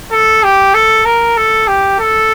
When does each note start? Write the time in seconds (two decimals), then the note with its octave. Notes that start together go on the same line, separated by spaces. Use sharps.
0.12 A4
0.44 G4
0.74 A4
1.05 A#4
1.37 A4
1.68 G4
2.00 A4